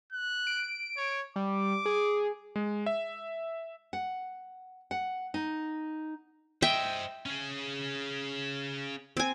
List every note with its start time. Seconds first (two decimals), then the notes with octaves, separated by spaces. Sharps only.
0.13 F#6
0.47 D7
0.97 C#5
1.36 G3 D6
1.86 G#4
2.56 G#3
2.86 E5
3.93 F#5
4.91 F#5
5.34 D#4
6.62 C5 D#5 E5 G5
7.26 C#4 G#4
9.17 C4 G#5